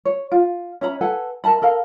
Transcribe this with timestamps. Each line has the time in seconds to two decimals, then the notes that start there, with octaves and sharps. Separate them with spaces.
0.05 C#5
0.32 F4
0.81 C#4 E5 A#5 B5
1.01 A4 B4 F#5 G#5
1.44 A#4 E5 A5 B5
1.62 A4 A#4 F5